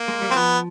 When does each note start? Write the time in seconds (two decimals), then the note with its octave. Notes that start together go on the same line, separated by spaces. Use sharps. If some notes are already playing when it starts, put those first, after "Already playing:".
Already playing: A#3
0.08 G#3
0.22 G3
0.29 F#3 C4
0.35 F3 B3